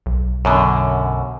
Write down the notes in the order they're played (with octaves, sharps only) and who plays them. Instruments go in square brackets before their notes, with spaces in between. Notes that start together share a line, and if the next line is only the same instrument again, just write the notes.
[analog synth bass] B1
[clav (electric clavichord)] F#2 B2 D3